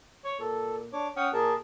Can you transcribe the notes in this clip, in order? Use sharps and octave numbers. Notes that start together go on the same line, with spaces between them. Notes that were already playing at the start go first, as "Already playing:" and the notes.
C#5
A#2 A4
D4 C#5 D6
C#4 F#5 G5 D#6
A#2 G#4 A#4 A5